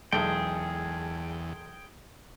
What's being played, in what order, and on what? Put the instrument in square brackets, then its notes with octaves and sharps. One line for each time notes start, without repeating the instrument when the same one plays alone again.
[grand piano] E1 G#3 A4 [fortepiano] B1 [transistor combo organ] E2 [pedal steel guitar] G#4 G5